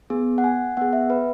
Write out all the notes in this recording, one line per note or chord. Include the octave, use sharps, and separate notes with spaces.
B3 G#4
F#5
G#5
B3 G#4 F#5
E5
B4